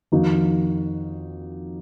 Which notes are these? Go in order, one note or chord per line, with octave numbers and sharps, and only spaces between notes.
F2 D#3 A#3 D#4 F#4